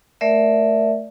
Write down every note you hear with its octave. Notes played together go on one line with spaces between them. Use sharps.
A3 A#4 D5 E5